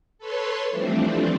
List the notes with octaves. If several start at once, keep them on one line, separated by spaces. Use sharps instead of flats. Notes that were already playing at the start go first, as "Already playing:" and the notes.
A4 B4 C#5 C6
E3 F3 G3 A3 C4 D4